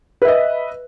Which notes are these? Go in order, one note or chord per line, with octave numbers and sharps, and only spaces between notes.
B4 D#5 E5